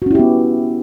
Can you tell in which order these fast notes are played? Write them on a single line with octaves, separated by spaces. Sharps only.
F#4 C#4 E4 G4 B3